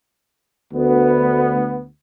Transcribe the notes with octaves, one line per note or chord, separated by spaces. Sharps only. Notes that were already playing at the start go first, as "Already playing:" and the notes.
D2 B3